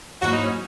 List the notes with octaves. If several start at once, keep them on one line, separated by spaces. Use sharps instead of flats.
G#2 F#3 A#3 E4 F#4
D#4
C#4